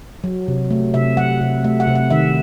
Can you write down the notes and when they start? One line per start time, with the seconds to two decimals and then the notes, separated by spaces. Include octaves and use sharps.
0.24 F#3
0.48 C3
0.71 A3
0.94 C3 E5
1.17 F#3 F#5
1.41 C3
1.64 A3 E5
1.80 F#5
1.87 C3
1.95 F#5
2.11 D#3 E5